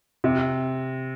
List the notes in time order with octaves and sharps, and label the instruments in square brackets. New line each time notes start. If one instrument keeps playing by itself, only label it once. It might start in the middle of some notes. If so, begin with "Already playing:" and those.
[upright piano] C3